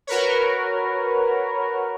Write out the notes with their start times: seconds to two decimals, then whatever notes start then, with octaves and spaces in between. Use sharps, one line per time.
0.07 F#4 A#4 B4 C#5